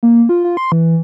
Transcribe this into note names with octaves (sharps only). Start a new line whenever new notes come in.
A#3
F4
F4
C6
E3